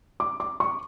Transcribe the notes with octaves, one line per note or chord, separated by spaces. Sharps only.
D6
D6
C#6